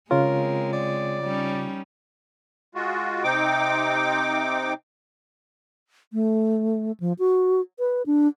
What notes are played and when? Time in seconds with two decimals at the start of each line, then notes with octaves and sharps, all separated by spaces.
0.11 C#3 G#3 C4 F4 A#4 C#5
0.73 D5
1.23 G3 C#4 D#4
2.75 G#3 F4 F#4
3.23 C3 C4 D#4 G5 D6
6.13 A3
7.00 F3
7.19 F#4
7.79 B4
8.06 D4